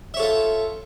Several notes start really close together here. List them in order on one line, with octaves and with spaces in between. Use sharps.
E5 C#5 A4 F4